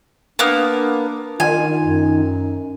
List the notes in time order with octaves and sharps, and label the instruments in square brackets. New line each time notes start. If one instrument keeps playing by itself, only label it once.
[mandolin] A#3 B3 [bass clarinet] D4
[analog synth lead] D#3 [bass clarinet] F4 [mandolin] G#5
[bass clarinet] F#2